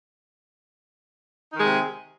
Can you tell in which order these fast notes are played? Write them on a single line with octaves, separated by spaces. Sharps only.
D#4 D#3 G#3 C3